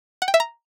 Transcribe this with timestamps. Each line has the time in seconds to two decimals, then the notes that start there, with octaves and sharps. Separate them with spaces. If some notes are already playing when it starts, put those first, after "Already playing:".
0.22 F#5
0.28 G5
0.34 E5
0.40 A#5